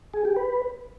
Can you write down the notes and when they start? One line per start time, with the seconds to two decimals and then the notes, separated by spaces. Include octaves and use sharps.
0.14 G#4
0.25 G4
0.36 B4